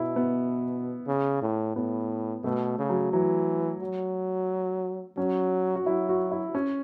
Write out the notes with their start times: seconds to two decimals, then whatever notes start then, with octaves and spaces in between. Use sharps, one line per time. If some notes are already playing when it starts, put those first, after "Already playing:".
Already playing: B2 E4
0.16 B3
1.07 C#3
1.42 A2
1.76 A2 B3
2.44 B2 A3
2.79 C#3
2.89 F#3
3.13 E3 F#3
3.81 F#3
5.17 F#3 C#4
5.76 F#4
5.86 F#3 E4
6.09 F#4
6.31 E4
6.55 C#4